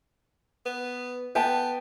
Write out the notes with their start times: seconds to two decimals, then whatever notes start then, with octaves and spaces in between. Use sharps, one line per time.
0.66 B3
1.35 B3 G5 A5